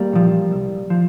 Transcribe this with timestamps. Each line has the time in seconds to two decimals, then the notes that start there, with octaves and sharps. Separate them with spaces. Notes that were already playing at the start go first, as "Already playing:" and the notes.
Already playing: G3 A#3
0.13 A#2 F3
0.51 C2
0.90 F3